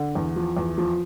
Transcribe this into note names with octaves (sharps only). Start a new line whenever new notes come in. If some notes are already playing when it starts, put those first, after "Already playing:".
Already playing: D3
E2
F3
E2
F3